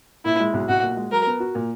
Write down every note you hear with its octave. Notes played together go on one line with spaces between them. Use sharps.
A#2 E4
G#3
B1
B1 F#4
A#2
G#3
F#3 A#4
B3
F#4
A#2